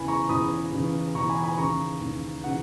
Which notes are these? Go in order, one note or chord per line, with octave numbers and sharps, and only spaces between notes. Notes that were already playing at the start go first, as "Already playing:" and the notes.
Already playing: E2 C#3 E3 G#5 B5
A#5 C#6
E2 C#3 E3 B5 D#6
E2 C#3 E3
E2 C#3 E3 A#5 C#6
G#5 B5
G#5 B5
D#2 C#3 E3 A#5 C#6
D#2 C#3 E3
C#3 E3 F#5